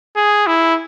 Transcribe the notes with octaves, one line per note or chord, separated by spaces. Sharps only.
G#4
E4